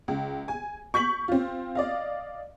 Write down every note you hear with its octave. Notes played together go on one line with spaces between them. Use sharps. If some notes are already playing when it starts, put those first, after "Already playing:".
C#2
G#5
C#6 G6 B6 F#7
C4 F4
D5 D#5 F5